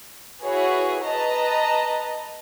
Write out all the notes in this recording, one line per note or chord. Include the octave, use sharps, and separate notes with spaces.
E4 F#4 G#4 B4 C#5
B4 D#5 A5 A#5